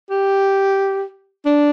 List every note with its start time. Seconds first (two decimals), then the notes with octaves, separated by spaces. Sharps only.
0.10 G4
1.45 D4